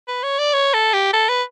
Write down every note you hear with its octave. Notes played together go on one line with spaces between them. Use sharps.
B4
C#5
D5
C#5
A4
G4
A4
B4